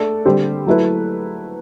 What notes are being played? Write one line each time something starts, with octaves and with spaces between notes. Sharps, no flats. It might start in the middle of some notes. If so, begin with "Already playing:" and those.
Already playing: A3 D4 A4 D5
D3 G3 C4 G4 C5
F#3 A3 E4 B4